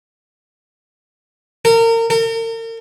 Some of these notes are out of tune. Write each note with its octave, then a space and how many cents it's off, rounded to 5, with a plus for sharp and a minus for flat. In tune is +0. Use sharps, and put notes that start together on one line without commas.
A#4 -30
A#4 -40